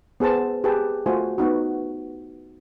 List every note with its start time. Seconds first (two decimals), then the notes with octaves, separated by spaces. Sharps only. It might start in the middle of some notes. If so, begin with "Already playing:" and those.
0.20 B3 G#4 C5 A5
0.64 G4 G#4 B4 G5 A5
1.06 A3 F4 F#4 C5 G#5
1.38 B3 D#4 F#4